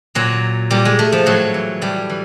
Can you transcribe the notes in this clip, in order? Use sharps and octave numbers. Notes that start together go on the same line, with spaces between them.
A#2 F#3
A#2 G3
G#3
A3
F3
A2 F#3
E3
A2 G3
E3